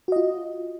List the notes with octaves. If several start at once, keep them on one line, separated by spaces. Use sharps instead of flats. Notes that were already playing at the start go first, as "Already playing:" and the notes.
F4 F#4 D#5